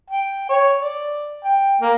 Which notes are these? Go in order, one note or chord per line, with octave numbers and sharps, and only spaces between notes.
G5
C#5
D5
G5
A#3